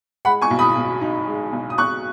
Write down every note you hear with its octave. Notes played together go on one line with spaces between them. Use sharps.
G#3 F#5 B5
G#5 C#6
B1
B5 D#6
B2
D#4
G#3
B1
D#6
B2 C#6 F#6